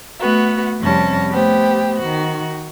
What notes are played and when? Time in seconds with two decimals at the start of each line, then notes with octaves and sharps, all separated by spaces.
0.18 A3 B3 F#4
0.79 F2 C3 G3 C#4 A5 A#6
1.29 A3 B3 G4 C5
1.99 D#3 F#4